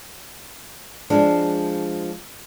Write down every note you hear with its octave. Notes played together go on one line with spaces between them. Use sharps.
F3 G#3 D4